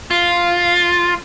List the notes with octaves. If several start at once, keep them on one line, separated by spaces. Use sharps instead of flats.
F4